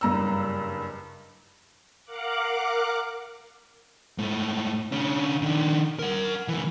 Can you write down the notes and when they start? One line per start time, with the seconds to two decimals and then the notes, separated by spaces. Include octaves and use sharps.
0.01 F#1 G2 A#5 E6
2.05 A#4 F5 F#5 D6 F#6
4.18 G#2 A3
4.92 D3 C#4
5.42 D#3 D4
5.99 A#4 F#5
6.48 C#2 E3